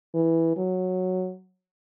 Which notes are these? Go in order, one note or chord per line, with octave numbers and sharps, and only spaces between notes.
E3
F#3